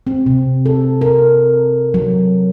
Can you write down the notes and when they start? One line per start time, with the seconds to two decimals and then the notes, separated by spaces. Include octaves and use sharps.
0.07 C4
0.26 C3
0.66 A4
1.01 A#4
1.94 F#3